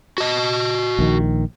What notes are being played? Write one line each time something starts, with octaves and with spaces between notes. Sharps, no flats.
F#4 D#5
A#1 D#3